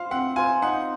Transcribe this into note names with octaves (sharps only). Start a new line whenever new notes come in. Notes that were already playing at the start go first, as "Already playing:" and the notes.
Already playing: F4 C5 F5
C4 F#5
F4 C5 G#5
D#4 F#5